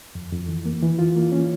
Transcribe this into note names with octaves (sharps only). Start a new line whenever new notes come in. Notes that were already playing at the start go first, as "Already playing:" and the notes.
F2
F2
E3
A#3
E3
F4
A#3
C#4